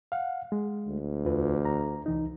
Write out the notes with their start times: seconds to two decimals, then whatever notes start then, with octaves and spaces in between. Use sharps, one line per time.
0.12 F5 F#5
0.52 G#3
0.87 D2
1.25 E2 F4 B4
1.65 A#5
2.06 C2 E3 D#4